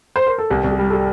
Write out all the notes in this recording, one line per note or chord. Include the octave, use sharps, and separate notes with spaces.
C5
A#4
A4
C2 G4
C2
G4
G3
A4
G4